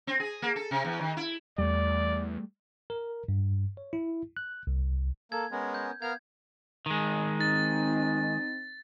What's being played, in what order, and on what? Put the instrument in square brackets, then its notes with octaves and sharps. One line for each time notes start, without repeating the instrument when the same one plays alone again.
[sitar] C4
G#4
A#3
A4
C3
E2
D#3
E4
[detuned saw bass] E2 [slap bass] G3 A3 [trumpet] D5
[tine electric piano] A#4
G2
C#5
E4
F#6
C2
[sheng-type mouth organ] A#3 [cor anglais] A4 [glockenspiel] G#6
[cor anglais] G#3 [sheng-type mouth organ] B3 C#4 A#4
[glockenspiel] G6
[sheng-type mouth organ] B3 F5 F6 [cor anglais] A#4 [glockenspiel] G#6
[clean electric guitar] D#3 G#3
[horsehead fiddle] C4 D#4 [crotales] A6